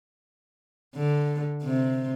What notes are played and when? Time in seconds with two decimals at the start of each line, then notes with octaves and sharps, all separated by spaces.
0.96 D3
1.63 C3